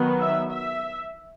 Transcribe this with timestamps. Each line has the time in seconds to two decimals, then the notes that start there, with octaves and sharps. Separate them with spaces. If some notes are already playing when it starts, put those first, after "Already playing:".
Already playing: D#3 F#3 B3
0.20 E5
0.51 E5